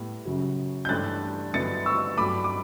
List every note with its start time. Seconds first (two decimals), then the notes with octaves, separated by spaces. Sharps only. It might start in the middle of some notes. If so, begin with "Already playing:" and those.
Already playing: A2 G3 B3 E4 A4
0.25 F#2 C#3 F#3
0.85 G6
0.89 G2 E3 A3 D4 F#6 A6
1.53 G2 D3 F#3 B3 E4 A6 C#7
1.86 C#6 E6
2.17 G2 F#3 A3 B5 D6
2.44 D6